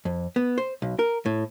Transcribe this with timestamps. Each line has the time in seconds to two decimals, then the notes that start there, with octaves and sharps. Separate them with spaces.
0.05 F2
0.36 B3
0.58 C5
0.82 B1
0.99 A#4
1.26 A2